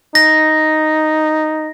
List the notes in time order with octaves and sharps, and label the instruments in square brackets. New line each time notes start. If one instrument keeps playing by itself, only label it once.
[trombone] D#4 [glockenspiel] A#6